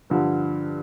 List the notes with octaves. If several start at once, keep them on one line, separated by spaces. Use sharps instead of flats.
G2 D3 F3